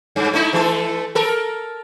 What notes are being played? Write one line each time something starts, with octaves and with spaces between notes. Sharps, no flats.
G2
A3 D#4 E4
E3 A3 A4
A4 A#4